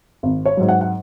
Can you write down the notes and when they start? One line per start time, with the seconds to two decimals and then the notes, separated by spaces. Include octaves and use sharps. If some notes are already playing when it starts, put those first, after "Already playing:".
0.23 G#1
0.46 C#5
0.57 G#2 F#3
0.68 F#5
0.81 F#5